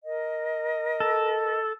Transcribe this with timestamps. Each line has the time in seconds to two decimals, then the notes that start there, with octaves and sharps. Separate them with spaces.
0.04 A#4 D#5
1.00 A4